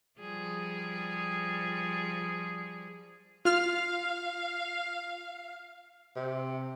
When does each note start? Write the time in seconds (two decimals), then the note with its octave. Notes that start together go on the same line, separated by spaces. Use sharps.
0.19 F3 G3 G#4
3.45 F4 F5 F6
6.16 C3